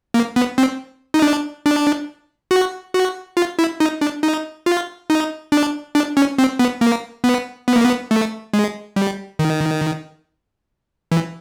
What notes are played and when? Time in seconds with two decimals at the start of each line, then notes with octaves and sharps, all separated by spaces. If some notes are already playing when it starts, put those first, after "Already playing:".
0.14 A#3
0.36 B3
0.58 C4
1.14 D#4
1.22 D4
1.66 D4
2.51 F#4
2.94 F#4
3.37 F4
3.59 E4
3.80 D#4
4.01 D4
4.23 D#4
4.66 F4
5.10 D#4
5.52 D4
5.95 D4
6.17 C#4
6.38 C4
6.59 B3
6.81 A#3
7.24 B3
7.68 B3
7.76 A#3
7.85 B3
8.11 A3
8.53 G#3
8.96 G3
9.39 D#3
11.12 E3